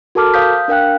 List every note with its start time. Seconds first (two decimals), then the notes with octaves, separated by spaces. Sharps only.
0.15 F#4 A4 A#4 A5 D6 F6
0.34 C5 F5 D#6 G6 B6
0.68 D4 A#4 F5 G5 F#6